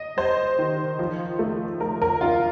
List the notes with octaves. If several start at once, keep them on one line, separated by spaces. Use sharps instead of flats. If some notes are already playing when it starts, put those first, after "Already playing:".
Already playing: D#5
G3 C5
D#3
F3
A3
A3 A#4
A#4
D4 F4